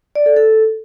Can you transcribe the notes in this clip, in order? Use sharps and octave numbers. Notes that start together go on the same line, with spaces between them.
D5
A4
A4